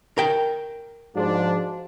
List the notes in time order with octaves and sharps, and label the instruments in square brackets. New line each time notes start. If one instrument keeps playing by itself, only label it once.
[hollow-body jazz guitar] A#4 G5
[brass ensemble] G#2 F3 D4 [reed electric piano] F#4 G#4 C5